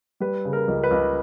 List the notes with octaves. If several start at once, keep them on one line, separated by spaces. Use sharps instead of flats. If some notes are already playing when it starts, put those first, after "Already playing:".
G3 B4
C#3
A#4
C#2
B4
C#2